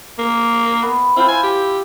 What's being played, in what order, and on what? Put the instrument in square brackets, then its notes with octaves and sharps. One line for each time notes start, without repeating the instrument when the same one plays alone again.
[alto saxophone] A#3
[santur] B3
[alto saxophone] C4 [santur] E4 F4 C5
[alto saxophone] G#5
G4